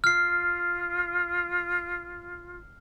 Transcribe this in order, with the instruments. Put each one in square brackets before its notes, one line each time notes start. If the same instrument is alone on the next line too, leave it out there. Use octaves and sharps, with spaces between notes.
[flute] F4 [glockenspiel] F6 C7